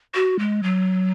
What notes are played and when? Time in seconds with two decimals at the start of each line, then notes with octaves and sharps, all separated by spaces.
0.15 F#4
0.39 G#3
0.63 F#3